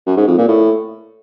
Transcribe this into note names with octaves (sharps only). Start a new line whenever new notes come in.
F#2
G#2
F2
A#2
A2